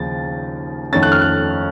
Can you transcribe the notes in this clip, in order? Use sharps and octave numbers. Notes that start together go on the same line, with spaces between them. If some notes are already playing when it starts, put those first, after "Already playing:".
Already playing: D#2 C#3 F3 A6
F2 D#3 A3 C#4 A6
F#6
F6
F#6